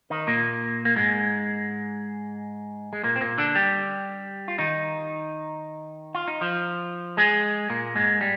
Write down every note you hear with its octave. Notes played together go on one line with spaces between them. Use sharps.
D#3 D#4
A#2 A#3
A#3
G#2 G#3
G#3
A#2 A#3
C4
A#2 A#3
D3 D4
G3 G4
F4
D#3 D#4
F4
D#4
F3 F4
G#3 G#4
A#2 A#3
G#2 G#3
G3